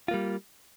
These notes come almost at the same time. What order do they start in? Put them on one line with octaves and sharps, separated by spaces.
F4 A#3 G3